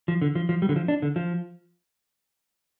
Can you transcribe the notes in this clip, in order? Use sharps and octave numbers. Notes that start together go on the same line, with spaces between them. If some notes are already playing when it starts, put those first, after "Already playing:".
F3
D3
F3
F3
G3
D3
F3
D4
D3
F3